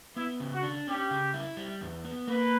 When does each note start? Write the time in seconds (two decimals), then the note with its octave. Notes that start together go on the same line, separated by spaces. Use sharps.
0.16 B3 E4
0.40 C#3
0.52 F#4
0.63 D4
0.87 C#4 G4
1.10 C#3
1.34 E4
1.57 G3
1.81 E2
2.05 B3
2.28 A#3 B4